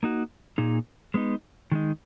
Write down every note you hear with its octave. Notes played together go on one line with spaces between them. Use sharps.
A#3 D#4 F#4
A#2 A#3 D#4 G#4
G#3 B3 D#4
D#3 G#3 D#4